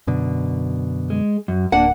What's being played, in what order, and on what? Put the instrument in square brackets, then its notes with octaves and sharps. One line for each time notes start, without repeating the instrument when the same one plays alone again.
[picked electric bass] F#2 B2 D3
[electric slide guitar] G#3
F#2
[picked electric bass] D1 [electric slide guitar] A#3 D4 [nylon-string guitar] F#5